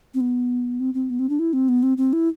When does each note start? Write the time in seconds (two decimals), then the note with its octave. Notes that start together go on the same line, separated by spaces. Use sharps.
0.14 C4
0.21 B3
0.80 C4
0.94 C4
1.10 B3
1.19 C4
1.29 D4
1.39 E4
1.53 C4
1.69 B3
1.83 C4
1.97 C4
2.13 E4